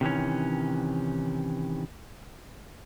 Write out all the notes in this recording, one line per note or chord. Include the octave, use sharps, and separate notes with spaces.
C3 D#3 E3 C#4